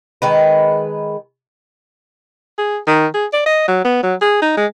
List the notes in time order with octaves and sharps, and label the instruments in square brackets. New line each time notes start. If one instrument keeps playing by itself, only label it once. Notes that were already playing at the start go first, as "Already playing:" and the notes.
[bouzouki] D#3 G#3 B4
[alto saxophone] G#4
D#3
G#4
D5
D#5
F#3
B3
F#3
G#4
D#4
G#3